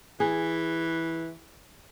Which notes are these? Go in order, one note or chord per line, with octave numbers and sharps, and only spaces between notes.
E3 G#4